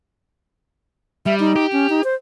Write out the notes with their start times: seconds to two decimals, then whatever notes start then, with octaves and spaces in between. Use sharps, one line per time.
1.26 G3 E5
1.40 D#4
1.56 G4
1.72 C#4
1.90 D#4
2.04 C5